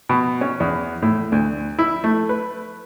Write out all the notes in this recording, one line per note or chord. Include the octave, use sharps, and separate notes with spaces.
B2
C#4
E2
A2
D2
E4
A3
B4